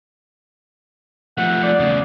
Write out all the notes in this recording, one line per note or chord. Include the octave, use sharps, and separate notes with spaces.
F3 A3 F#5
D5
E2 C#3